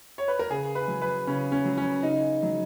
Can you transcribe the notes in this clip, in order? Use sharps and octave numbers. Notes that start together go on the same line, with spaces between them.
C#5
B4
A#4
C#3 G#4
B4
F#3
B4
C#3 C#4
C#4
F#3
C#4
C#3 D#4
F#3